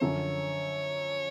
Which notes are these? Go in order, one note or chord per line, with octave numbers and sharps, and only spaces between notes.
F#2 D3 F3 C#5